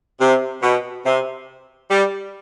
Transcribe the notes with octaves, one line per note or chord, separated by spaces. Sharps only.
C3
B2
C3
G3